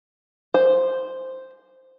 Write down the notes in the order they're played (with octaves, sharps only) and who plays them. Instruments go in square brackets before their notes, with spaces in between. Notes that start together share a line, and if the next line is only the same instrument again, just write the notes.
[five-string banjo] C5